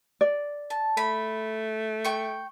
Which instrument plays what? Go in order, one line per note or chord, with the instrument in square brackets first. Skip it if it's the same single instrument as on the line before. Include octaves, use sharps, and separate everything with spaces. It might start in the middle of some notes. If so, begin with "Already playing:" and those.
[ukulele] D5
[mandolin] A5
[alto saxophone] A3 [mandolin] B5
[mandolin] G5 C#6